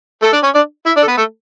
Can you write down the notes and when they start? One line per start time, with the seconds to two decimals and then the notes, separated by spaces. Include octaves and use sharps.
0.22 A3 A4
0.33 D4 D5
0.43 C#4 C#5
0.54 D4 D5
0.86 E4 E5
0.97 D4 D5
1.03 A4
1.07 B3 B4
1.17 A3 A4